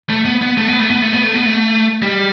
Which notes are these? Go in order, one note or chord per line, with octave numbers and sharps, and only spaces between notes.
A3
B3
B3
A3
B3
A3
B3
A3
B3
A3
B3
A3
G3